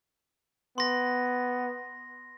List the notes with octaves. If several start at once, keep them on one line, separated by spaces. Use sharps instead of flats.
B3 C6 A#6